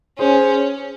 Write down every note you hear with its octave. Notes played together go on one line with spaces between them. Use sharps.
C#4 G#4 C5